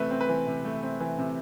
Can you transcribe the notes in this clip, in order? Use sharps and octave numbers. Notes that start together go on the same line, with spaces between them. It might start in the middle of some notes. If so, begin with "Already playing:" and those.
Already playing: C3 E3 A3 C4 B4
C4
B4
E3
C3
A3
C4
E3
C3